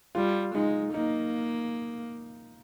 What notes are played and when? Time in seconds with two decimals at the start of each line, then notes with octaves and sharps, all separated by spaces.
0.15 G3 F4
0.55 G#3 D#4
0.94 A#3 D#4